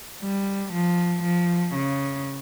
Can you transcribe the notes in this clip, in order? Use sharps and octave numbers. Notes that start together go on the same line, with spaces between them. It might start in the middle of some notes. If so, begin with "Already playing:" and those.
G3
F3
F3
C#3